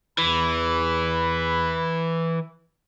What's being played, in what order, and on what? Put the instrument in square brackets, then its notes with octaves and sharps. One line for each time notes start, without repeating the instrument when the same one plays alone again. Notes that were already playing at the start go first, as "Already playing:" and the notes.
[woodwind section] E2 B5 [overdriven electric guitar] E3